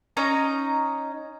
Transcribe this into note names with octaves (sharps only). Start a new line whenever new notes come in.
C#4 D#4 A#5